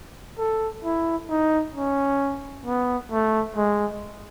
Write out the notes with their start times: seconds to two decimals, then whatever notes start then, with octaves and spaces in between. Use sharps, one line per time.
0.39 A4
0.85 E4
1.30 D#4
1.75 C#4
2.66 B3
3.11 A3
3.56 G#3